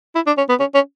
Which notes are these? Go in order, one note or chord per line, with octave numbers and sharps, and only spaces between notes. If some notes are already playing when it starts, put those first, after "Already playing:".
E4
D4
C#4
B3
C#4
C#4